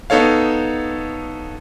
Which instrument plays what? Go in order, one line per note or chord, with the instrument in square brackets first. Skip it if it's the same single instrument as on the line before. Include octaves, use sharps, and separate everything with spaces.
[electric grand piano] B3 D#4 A4 C#5 F5